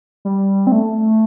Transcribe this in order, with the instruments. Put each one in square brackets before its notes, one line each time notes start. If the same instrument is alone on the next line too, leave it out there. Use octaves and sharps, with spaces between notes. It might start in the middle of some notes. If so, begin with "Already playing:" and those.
[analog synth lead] G3
C4
A3